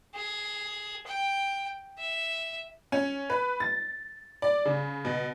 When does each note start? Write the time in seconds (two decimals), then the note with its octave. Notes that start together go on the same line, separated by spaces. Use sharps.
0.15 G#4
1.07 G5
1.99 E5
2.92 C#4
3.30 B4
3.60 A6
4.42 D5
4.65 C#3
5.05 B2